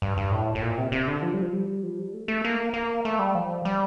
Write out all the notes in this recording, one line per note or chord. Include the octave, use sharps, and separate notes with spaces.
G2
G2
A2
A2
A#2
C3
C3
D3
F3
G3
F3
G3
F3
G3
A3
A3
A#3
A#3
A3
G3
F3
G3